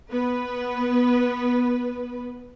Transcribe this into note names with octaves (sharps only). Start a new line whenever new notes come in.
B3 B4